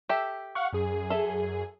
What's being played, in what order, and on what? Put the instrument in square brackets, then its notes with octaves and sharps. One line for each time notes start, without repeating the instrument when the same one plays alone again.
[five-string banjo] G4 A4 E5
[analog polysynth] F5 F#5 C#6
F#2 G#4
[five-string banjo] A4 E5